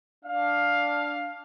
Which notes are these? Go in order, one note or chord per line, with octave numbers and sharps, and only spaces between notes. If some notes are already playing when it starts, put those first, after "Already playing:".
D4 F5